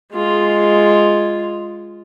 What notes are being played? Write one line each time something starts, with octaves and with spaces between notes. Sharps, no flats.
G#3 F4